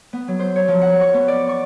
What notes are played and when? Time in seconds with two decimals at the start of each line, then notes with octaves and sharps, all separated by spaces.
0.13 B3
0.28 F#3
0.39 C5
0.56 C#5
0.68 F3
0.82 F#5
1.01 C#6
1.14 B3
1.28 D5
1.49 C#6